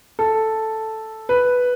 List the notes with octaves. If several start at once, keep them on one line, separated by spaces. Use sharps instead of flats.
A4
B4